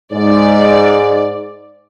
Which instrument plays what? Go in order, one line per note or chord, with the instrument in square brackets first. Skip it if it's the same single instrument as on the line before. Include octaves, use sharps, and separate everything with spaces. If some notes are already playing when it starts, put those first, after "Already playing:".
[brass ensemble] G#2 [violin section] D5